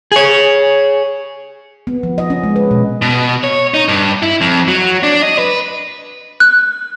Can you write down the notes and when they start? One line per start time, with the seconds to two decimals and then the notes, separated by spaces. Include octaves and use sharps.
0.12 G#4 C#5
1.87 B3
2.03 F3
2.18 D#5
2.30 C#4
2.43 G#3
2.56 B4
2.71 B2
3.02 B2
3.44 C#5
3.74 D#4
3.89 G2
4.23 E4
4.41 F2
4.68 F#3
5.03 D4
5.22 D#5
5.38 B4
6.40 F#6